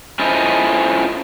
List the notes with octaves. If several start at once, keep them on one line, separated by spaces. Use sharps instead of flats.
C#4 E4 F4 A4 C5 D#5